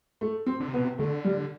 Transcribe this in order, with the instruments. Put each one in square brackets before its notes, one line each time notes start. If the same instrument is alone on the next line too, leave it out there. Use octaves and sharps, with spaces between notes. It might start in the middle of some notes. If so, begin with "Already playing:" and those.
[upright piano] A3
C4
[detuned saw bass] D3
C3
[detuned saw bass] B2 [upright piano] B3
[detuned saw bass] C3
[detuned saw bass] D3 [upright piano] A3
[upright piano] G3